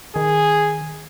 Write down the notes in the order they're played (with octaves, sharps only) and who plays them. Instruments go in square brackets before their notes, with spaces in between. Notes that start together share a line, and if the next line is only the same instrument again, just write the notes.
[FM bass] D#3 [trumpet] G#4